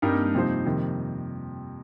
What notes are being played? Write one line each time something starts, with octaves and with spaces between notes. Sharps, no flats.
G2 G3 C4 D#4 G4 A#4
A#3
G3
F2 C3 F3 A#3 D#4 C5
F2 C3 D#3